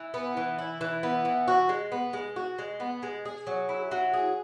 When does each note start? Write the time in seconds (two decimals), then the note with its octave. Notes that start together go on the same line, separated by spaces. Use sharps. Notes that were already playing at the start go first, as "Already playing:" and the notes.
Already playing: E3
0.14 B3
0.37 E3
0.59 E4
0.81 E3
1.03 B3
1.25 E3
1.48 F#4
1.69 G#3
1.92 B3
2.13 G#3
2.36 F#4
2.59 G#3
2.80 B3
3.03 G#3
3.25 G#4
3.47 F#3
3.69 E4
3.91 F#3
4.13 G#4